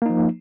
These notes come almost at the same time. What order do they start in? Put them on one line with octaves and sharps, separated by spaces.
A#3 D#4 F3